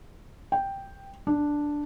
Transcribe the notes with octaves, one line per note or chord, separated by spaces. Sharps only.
G5
D4